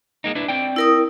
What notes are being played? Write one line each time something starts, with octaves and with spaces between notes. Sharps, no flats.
G#3 A#3 D#4
D4 E4 B4
C4 D5 G5
E4 A#4 D#6